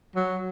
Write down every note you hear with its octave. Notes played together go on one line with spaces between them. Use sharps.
F#3